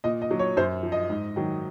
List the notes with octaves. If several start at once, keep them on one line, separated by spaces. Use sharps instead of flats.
A#2 D#5
D#5
F#3
C#5
F#2 C5
F3
D#5
G#2
D#3 F#3